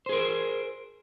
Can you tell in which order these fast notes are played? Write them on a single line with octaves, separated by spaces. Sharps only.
C5 G#4 A#4